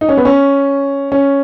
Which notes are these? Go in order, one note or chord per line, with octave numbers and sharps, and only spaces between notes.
D#4
C#4
B3
C#4
C#4